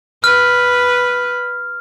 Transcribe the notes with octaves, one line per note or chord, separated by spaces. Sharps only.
B4 F6